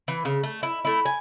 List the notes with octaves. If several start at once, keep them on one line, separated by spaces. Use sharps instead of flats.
E3
C#3
A3
E4
A3 E4
G#5